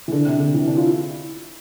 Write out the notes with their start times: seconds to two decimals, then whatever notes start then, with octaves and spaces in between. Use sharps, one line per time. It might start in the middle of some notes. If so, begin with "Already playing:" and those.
0.08 E3
0.12 D3
0.26 C3
0.40 D3
0.54 E3
0.67 D4
0.77 F4
0.82 E4